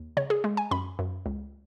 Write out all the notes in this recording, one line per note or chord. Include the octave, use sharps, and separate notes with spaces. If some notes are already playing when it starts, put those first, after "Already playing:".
Already playing: D#2
C#3 C#5
G#4
G#3
G#5
F#2 B5
F#2
C#2